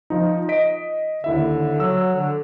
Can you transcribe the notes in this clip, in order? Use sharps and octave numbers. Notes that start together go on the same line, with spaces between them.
F3 D#4
D#5 B6 D7
D#2 D3 E4 E5
F#3 E6
D3